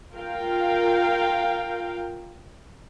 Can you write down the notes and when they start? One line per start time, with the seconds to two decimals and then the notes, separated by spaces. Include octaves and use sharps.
0.15 F4 A#4 F5 G5